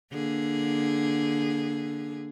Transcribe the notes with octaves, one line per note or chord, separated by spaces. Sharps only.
D3 A#3 G#4